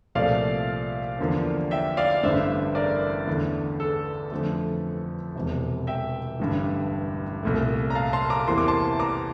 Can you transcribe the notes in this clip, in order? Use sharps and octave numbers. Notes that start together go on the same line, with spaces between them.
C2 A#2 F3 A3 D5 F5
E2 D3 F3 A#3
E5 G5
D5 F5
A1 G2 D3 C5 E5
A#4 D5
E2 D3 A3
A4
F2 D3 F3 A3
E1 E2 C3
E5 G5
A1 G2 D3
C2 A#2 A3
A#5
F5 A5
A5 C6
A#5 D6
E2 C3 E3 A#3 C6
D6
A5 C6
A#5 D6